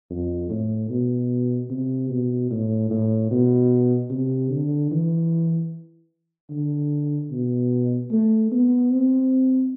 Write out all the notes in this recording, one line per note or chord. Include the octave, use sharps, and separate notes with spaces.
F2
A2
B2
C3
B2
A2
A2
B2
C3
D3
E3
D3
B2
A3
B3
C4